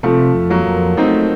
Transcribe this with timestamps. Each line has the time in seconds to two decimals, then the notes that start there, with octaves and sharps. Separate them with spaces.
0.03 C3 F3 A3
0.35 F2
0.50 F#3 A#3
0.66 F2
0.97 A3 C4 D#4